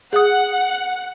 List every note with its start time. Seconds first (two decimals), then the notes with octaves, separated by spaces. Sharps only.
0.13 G#4 F#5 D#6